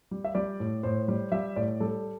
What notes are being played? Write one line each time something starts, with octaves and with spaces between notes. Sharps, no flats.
G3
E5
G3 D5
A2
A2 C5
G3
G3 E5
A2 D5
G3 A4